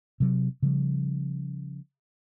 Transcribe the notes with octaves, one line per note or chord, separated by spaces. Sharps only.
C3 F#3
C#3 F3 G3